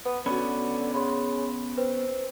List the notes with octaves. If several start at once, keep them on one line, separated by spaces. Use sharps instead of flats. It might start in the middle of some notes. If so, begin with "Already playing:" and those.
B3
D3 B3 C#4 F#4 B5
C#3 B5 C6
C4 B4